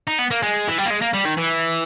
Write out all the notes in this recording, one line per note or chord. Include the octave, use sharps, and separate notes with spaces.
D#4
B3
A#3
G#3
E3
G3
A#3
G#3
A#3
G3
D#3
E3